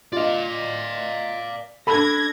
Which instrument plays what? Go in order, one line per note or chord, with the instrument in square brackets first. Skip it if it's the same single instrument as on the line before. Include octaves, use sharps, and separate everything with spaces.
[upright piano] F4 D#5 [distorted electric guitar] D5 F5
[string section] D4 G#6 A#6 [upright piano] A4 B5